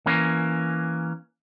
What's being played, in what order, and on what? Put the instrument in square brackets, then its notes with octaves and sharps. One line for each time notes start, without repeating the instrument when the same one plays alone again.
[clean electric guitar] E3 A#3 C#4